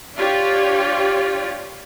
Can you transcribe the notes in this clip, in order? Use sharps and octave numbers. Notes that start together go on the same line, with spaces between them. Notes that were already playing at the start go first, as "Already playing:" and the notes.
D4 F4 G4 C#5 D5